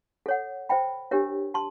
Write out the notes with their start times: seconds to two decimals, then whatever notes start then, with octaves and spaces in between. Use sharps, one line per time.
0.26 A4 C#5 F#5
0.69 C5 E5 G5 B5
1.11 D4 G4 A#4 C#5 E5
1.54 A5 C6